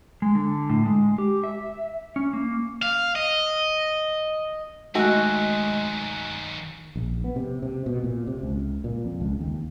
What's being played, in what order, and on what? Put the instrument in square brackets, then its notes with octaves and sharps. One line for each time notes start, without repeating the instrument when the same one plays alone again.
[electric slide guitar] G#3
D3
A2
G#3
G4
E5
C#4
A#3
[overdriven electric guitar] F5
D#5
[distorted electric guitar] D#3 F#3 [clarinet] G#3 [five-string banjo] A3 D#4 F#4 [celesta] G#5 F#6
[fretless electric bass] A#1
B3
C3
C3
B2
A#2
C3
C#2
A#2
F2
C#2
D#2